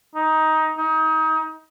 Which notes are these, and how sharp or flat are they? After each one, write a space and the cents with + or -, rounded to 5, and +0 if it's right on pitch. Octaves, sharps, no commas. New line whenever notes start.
D#4 +15
D#4 +30